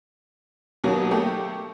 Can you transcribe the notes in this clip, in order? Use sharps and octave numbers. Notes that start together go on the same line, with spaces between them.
D#2 B2 F#3 A#3
A3 A#3 G4